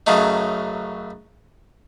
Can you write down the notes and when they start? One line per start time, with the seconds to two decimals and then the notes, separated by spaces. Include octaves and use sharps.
0.07 F#2 C#3 F#3 A3 D#4